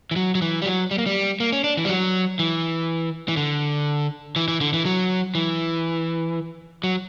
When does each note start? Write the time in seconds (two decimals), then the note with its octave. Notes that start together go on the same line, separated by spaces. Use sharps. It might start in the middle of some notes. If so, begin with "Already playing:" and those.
0.11 E3
0.16 F#3
0.35 F#3
0.42 E3
0.62 G3
0.66 F#3
0.91 G3
0.98 A#3
1.06 G3
1.40 A#3
1.53 C#4
1.64 D4
1.77 E3
1.85 G3
1.89 F#3
2.39 E3
3.28 E3
3.37 D3
4.36 E3
4.48 E3
4.61 D3
4.74 E3
4.86 F#3
5.35 E3
6.84 F#3